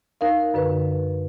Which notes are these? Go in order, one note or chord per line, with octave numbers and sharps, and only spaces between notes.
D#4 A#4 F5
F#2 D3 B4